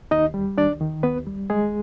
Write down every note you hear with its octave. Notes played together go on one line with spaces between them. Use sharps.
D#2 D#4 D#5
G3
D#2 D4 D5
D#3
D#2 B3 B4
G3
D#2 G#3 G#4